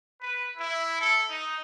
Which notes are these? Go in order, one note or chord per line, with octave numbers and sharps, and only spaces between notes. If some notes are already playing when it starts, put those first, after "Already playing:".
B4
E4
A4
D#4